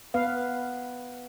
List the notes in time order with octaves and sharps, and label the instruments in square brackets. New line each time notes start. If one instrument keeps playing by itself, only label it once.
[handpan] B3 B4 F5